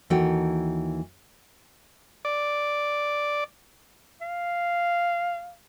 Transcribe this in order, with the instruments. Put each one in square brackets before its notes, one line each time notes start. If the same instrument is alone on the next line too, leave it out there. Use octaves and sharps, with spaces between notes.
[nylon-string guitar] D#2 E3 D#4 F#4 A4 G5
[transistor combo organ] D5
[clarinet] F5